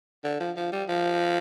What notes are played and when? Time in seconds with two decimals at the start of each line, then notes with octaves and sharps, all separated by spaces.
0.24 D3
0.40 F3
0.57 F3
0.72 G3
0.89 F3